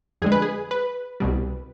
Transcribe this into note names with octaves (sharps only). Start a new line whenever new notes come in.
F2 D3 G#3 G#4
B4
G#4
B4
C2 B2 G3